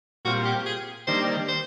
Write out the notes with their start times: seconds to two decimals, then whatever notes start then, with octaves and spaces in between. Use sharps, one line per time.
0.25 A#2 G3 C4 F4 F#4
0.45 G4
0.66 G#4
1.07 D#3 G3 A#3 D4 C5
1.48 C5